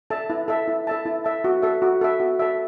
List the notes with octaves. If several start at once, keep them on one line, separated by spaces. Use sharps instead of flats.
A4 E5 A5
E4
A4 E5 A5
E4
A4 E5 A5
E4
A4 E5 A5
F#4
A4 E5
F#4
A4 E5
F#4
A4 E5